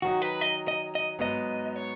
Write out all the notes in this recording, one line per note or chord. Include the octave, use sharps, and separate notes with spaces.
D#3 F#3 D#4 F#4
B4
D#5
D#5
D#5
G#2 F#3 B3 D#5
C#5